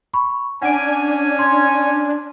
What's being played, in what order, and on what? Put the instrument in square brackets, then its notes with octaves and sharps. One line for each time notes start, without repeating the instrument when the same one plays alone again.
[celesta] B5 C#6
[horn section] C#4 G#5 [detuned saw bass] D4 [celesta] F#5 D7
[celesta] C6 G#6